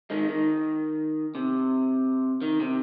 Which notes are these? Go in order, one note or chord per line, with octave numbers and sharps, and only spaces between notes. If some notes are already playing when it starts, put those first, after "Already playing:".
D#3 G#3
D#3
C3
D#3
C3